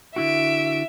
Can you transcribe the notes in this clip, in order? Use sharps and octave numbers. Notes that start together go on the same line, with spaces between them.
D3 E4 F#4 E5 D7